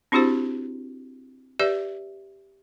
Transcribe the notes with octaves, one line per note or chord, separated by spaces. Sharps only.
C4 D4 E4 F#4 G4 C5
G4 B4 D5 E5